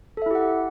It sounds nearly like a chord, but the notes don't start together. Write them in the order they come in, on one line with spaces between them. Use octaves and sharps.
A4 E5 E4 G4 F#5